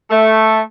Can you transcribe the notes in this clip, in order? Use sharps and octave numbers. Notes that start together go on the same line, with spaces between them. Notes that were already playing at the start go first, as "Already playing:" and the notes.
A3